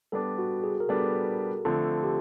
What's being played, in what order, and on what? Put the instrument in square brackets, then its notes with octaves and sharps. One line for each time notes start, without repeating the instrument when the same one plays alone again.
[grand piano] G3 B3 D4 [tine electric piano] A4
[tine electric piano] F#4
G#4
A#4
[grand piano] G3 B3 D4 [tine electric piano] A4
[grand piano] D3 F3 A3 C4 [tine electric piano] A4
[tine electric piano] G4